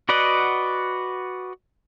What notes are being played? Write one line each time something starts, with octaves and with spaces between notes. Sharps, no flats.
F#4 B4 D5 D#5 F#5